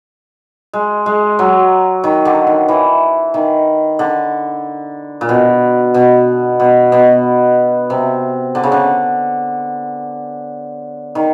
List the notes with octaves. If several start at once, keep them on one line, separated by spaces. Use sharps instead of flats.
G#3
G#3
F#3
D#3
D3
D#3
E3
D#3
D3
A#2
B2
B2
B2
B2
C3
D3
C#3
D3
D#3